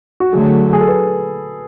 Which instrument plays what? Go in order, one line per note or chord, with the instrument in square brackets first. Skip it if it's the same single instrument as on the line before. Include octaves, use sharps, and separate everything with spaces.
[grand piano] F#4
[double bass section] D3 F#3 A3 [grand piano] G#4
[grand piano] G#4
A4
B4